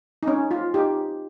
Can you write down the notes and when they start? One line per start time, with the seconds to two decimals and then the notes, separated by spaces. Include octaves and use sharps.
0.23 D#4
0.27 C#4
0.51 F4
0.74 D#4 G4